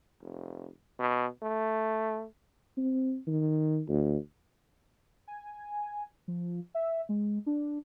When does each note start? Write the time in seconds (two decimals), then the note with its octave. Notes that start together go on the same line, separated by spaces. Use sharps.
0.21 F1
1.00 B2
1.43 A3
2.77 C4
3.27 D#3
3.89 D2
5.28 G#5
6.28 F3
6.75 E5
7.09 G#3
7.46 D4